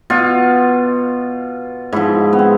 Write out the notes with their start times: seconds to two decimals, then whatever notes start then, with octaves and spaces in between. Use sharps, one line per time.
0.10 B2 F4
1.93 G#2 F3 E4
2.33 B3
2.39 C4